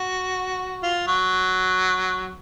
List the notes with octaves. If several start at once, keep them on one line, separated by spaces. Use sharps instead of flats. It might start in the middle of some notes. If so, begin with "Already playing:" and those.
Already playing: F#4
F4
F#3